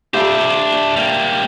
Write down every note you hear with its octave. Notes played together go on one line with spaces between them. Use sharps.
D4 G4 C5 E5 F5
G3 A#3